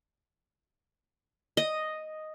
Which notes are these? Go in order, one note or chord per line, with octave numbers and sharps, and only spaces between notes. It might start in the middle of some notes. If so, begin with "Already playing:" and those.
D#5